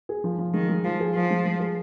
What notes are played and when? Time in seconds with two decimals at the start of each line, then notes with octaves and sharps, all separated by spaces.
0.09 G#4
0.24 F3
0.38 F3
0.54 D#3 G#3
0.69 G#3
0.84 F3 F4
1.00 G#4
1.14 F3 F4
1.30 G#3
1.45 G#3
1.60 G#4